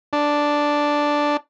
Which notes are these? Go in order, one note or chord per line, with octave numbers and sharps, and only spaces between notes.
D4